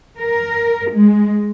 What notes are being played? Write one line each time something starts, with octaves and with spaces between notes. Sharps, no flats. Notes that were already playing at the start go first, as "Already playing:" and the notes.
A#4
G#3